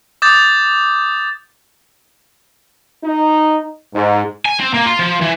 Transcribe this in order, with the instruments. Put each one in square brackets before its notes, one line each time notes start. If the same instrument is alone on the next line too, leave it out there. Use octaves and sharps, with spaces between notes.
[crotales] D6 D#6 G6 A6
[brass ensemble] D#4
G#2
[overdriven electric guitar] G#5
C4
A#3
F4
F3
E3